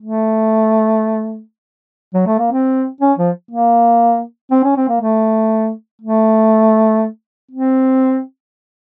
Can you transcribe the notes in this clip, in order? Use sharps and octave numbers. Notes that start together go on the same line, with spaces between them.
A3
F#3
A3
A#3
C4
C#4
F3
A#3
C4
C#4
C4
A#3
A3
A3
C4